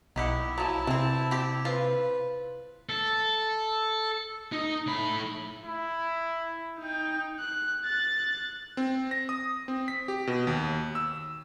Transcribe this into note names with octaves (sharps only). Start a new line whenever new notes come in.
B1 D#3 E4 G4 F#5
F3 F#3 E4 A5
C3 E3 C4
C4 G4
F4 B4 C5
A4
D#4
A2 B5
E4
D#4 G5
F#6
F#6 A6
C4
A#6
D#6
C4
B6
G4
B2
D#2
E6